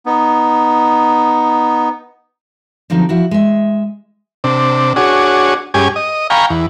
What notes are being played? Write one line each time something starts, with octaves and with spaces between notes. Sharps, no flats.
B3 D#4
D3 F3 F#3 C4 D#4
F3 E4 F#4
G#3 E5
C3 D4
D4 F#4 G#4 C#5
G2 C#4 G4 G#4 G#5
D#5
F5 G5 G#5 A#5 B5 C#6
E2